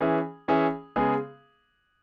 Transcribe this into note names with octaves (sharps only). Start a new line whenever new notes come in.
E3 C#4 G#4 E5
E3 C#4 G#4 E5
C#3 G#3 B3 G#4